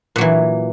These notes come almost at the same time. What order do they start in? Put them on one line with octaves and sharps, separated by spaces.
A#2 F#3 E3